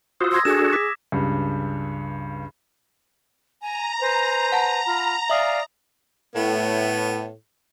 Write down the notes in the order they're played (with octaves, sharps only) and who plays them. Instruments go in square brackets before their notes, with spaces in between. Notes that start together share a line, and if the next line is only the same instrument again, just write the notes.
[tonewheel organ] F4 F#4 C5 [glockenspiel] D#6 E6
[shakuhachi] C6 [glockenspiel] E6 G#6 A#6
[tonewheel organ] D4 F#4 A4 [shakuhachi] G#4 [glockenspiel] E7
[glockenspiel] D6 B6
[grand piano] C#2 G2
[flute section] G#5 [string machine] A#5
[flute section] B4 C5 G#5
[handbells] F#5 A5
[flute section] F4 B5
[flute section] D5 F5 G#5 [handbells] E5 D#6
[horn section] A2 [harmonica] B3